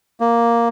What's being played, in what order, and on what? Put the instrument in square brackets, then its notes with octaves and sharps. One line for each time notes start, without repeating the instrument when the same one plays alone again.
[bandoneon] A#3